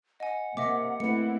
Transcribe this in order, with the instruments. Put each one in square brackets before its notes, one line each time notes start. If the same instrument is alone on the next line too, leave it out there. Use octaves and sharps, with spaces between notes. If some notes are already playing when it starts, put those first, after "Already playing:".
[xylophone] D#5 G#5 [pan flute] F#5
[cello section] C3 [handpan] A#3 [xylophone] D#5 E5 D6
[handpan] A3 B4 [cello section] C4 E4 [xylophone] C#7